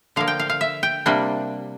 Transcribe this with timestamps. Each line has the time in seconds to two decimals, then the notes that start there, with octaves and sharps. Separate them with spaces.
0.16 D3 F3 A#3 F5
0.28 G5
0.39 F5
0.49 F5
0.61 E5
0.83 G5
1.06 C3 G3 A#3 D4